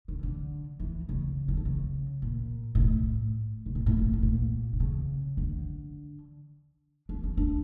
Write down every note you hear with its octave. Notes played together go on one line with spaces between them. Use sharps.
D3
D3
E3
C#3
E3
D3
C#3
A#2
A#2
A2
C#3
A#2
A2
A#2
A2
A#2
D3
C#3
D3
D4
C#4
D4